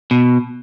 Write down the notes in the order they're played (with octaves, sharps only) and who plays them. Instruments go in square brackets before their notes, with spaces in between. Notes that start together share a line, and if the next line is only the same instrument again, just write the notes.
[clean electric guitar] B2